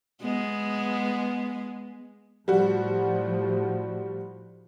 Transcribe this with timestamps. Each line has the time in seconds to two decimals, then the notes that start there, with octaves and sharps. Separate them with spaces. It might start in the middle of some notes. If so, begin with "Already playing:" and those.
0.21 G#3 B3
2.48 A2 F3 G3 F#4